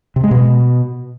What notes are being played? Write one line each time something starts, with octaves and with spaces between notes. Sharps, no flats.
C3
G#3
B2